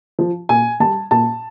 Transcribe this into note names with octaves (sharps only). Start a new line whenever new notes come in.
F3
A#2 G#5
G3 A5
A#2 A5